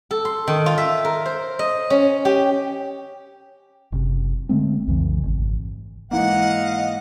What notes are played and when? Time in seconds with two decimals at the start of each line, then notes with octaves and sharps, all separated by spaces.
0.11 A4
0.25 C6
0.48 D#3
0.66 F4
0.78 E5
1.05 A#4
1.26 C5
1.59 D#5
1.90 C#4
2.25 G4
3.92 F#1 C3
4.49 D3 G#3 A3 C4
4.88 B1 F2 C#3 E3
5.23 G#1
6.11 G#2 E3 A#3 D#5 F5 F#5